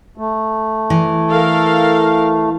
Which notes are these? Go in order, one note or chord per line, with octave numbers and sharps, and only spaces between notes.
A3
E3
A4 A#4 F5